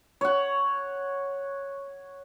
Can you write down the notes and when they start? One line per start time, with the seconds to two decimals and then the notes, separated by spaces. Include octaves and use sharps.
0.21 C#5 F#5